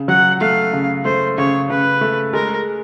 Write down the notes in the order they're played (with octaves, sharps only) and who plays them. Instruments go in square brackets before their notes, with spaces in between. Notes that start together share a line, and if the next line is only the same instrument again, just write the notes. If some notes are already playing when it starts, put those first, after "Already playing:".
Already playing: [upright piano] C#3
[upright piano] F#3 [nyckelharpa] F#5
[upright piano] A3 [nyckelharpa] F5
[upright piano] C#3
[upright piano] A3 [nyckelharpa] C5
[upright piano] C#3 [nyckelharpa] C#5
[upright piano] C#3 [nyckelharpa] B4
[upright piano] A3
[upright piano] G#3 [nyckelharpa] A#4